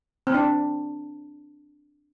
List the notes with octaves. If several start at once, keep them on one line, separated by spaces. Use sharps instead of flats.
C4
D4